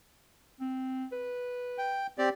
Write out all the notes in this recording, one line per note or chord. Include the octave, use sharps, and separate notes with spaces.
C4
B4
G5
C4 G4 D5